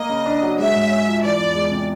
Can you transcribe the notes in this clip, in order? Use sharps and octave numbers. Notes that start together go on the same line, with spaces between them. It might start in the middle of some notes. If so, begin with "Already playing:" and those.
Already playing: A#3 D#5
C#3
D4
F#3
G#3 E5
G#2
C#4
F3
E3 D5
E2
G#3
C3